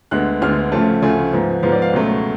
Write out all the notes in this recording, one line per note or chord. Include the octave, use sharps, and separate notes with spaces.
D2 D3 G#3 B3 F#6
D2 D3 G#3 B3 F6
D2 C#3 F3 A3 A5
D2 C#3 F3 A3 G#5
G#2 F3 B3
G#2 F3 B3 F5
D5
F5
C#2 B2 F#3 A3